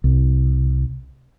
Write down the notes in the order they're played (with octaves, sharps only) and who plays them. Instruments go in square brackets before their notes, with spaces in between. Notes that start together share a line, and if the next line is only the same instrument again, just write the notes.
[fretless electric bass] C2